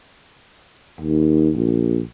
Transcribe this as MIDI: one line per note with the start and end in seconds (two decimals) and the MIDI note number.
1.01 1.50 39
1.56 2.01 34